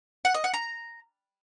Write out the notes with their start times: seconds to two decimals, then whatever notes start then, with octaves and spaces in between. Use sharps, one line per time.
0.25 F#5
0.34 D#5
0.44 F#5
0.54 A#5